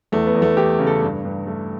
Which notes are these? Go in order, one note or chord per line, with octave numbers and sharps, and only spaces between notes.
E2 A3
B3
E2
A3
E3 G4
C#3
A4
G2
G2
A3